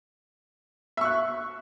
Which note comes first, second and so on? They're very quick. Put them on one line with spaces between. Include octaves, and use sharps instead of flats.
E5 C#6 F#6